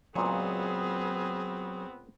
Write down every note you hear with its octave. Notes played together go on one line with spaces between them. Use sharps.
C#2 A#2 F#3 B3 C4 G#4 G#5